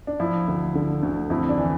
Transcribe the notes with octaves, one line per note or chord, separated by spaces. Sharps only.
D4
F3 E4
D2
D3
D2
F2 E4
D4
E3